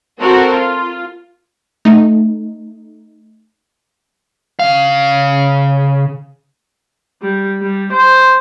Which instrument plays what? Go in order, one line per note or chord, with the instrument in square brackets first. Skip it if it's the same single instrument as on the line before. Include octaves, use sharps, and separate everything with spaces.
[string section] C4 F#4 A4 A#4 C5
F4
[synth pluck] A3 D#4
[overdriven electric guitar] C#3 F5
[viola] G3
G3
C5